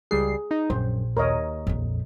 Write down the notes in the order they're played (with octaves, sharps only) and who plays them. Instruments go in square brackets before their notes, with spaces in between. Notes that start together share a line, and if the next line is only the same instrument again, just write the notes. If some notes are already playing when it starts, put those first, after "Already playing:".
[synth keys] C#2 G3 C7 [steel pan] G#4
[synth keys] D#4
[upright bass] A#1 [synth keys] F#2 [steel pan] C5
[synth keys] D#2 [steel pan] A#4 C#5 D#5
[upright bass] A#1 F2